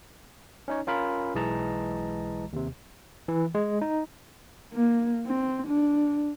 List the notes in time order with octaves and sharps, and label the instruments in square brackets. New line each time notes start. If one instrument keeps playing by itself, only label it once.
[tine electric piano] C#4 D#4 C#5
C#4 F4 A#4 B5
B1 E3 G#3 D#5 A5 A#5
D#2 C3
E3
G#3
D#4
[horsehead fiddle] A#3
C4
D4